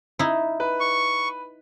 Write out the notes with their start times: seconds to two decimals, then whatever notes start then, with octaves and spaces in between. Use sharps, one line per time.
0.19 D#4 E4
0.60 B4
0.80 C#6